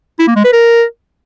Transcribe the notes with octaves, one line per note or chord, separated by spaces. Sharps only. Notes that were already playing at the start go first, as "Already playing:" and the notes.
E4
A#3
G#3
B4
A#4